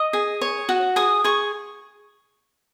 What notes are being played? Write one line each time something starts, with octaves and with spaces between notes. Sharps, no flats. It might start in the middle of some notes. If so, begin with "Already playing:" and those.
Already playing: D#5 D#6
G#4
C#5
F#4
G#4 D#6
G#4 C#6